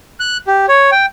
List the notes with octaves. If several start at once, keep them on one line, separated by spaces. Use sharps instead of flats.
F#6
G4
C#5
G5